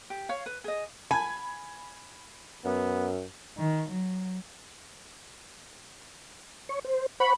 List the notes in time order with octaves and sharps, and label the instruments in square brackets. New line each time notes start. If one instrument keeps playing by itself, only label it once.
[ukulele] G4
C#5 F5
B4
G#4 D#5
[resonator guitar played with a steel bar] G#5 [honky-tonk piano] B5 G#6
[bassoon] F#2 [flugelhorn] B3
[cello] D#3
F#3
[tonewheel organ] C#5 C#6
C5
[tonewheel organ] C5 F#5 C#6 [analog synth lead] B5